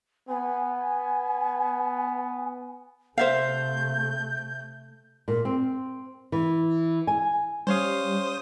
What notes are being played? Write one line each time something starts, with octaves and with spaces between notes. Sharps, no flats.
B3 G#5
C3 A3 C5 E5 F5 G6
A#2
C4
E3
G#5
G3 C#4 C5 C#5 F5 D#6